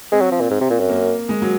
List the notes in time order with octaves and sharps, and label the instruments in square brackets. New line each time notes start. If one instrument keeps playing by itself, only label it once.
[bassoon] G#3 [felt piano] C4
[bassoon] F#3
F3
A#2
G#2
C3
A#2
F#2
[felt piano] A#3
G#3
F#3